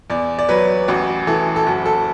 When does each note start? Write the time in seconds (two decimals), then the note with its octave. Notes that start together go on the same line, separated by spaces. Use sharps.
0.10 E2 D5
0.39 D5
0.49 F#3 B4
0.88 A1 F#4
1.27 E3 A4
1.56 A4
1.67 F#1 F#4
1.86 A4